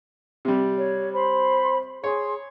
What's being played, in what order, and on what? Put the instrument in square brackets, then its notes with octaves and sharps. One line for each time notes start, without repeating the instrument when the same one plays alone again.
[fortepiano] C3 G3
[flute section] C#5
C5 B5 C6
[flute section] G#4 C6 [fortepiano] C#5